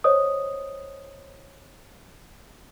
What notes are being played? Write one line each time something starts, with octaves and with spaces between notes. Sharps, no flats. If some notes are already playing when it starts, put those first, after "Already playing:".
C5 C#5 D#5 D#6